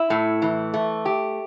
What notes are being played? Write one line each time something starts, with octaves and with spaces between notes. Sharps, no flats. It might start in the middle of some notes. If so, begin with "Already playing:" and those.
Already playing: E4
A2
E3
A3
G4